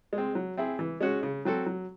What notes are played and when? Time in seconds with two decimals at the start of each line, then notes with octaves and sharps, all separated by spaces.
0.13 G#3
0.18 C4
0.35 F#3
0.57 C4 E4 G#4
0.79 E3
1.01 G#3 C#4 F#4
1.23 C#3
1.45 F#3 C4 F#4 A4
1.66 F#3